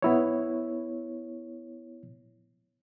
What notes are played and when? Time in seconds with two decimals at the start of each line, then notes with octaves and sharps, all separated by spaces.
0.02 B3 E4 C#5